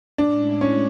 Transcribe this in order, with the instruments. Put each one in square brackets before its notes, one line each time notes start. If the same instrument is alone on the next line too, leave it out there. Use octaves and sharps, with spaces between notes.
[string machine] A2 G#3 C#4 E4 [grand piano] D4
[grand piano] C#4